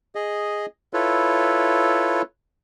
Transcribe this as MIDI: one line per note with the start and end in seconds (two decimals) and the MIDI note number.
0.15 0.66 68
0.15 0.66 75
0.93 2.22 64
0.93 2.22 65
0.93 2.22 69
0.93 2.22 71
0.93 2.22 73